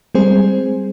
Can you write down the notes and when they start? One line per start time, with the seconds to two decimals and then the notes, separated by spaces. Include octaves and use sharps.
0.15 G3 G#3 C4 G#4 C5